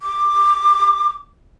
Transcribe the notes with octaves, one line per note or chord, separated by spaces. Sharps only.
D6